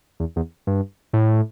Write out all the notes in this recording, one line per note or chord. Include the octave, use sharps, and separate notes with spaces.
E2
E2
G2
A2